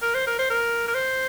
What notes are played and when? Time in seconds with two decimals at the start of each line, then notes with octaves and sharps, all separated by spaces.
0.02 A#4
0.14 C5
0.27 A#4
0.39 C5
0.50 A#4
0.88 A#4
0.94 C5